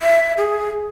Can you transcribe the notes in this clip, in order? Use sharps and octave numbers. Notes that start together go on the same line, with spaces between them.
E5
G#4